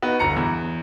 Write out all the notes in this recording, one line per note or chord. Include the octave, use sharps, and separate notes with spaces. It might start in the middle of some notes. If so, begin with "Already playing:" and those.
B3 D#4 F#4
G1 A#5 C#7
E2